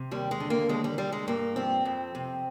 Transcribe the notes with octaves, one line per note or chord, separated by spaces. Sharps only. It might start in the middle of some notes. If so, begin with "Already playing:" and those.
Already playing: C3
D#2 G3
G#3
D3
A#3
D#2 G#3
G3
D3 G3
G#3
G2 A#3
F3 C4
F2
C3